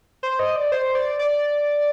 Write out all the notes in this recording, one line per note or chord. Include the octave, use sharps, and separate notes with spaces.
C5
D#5
D5
C5
D5
D5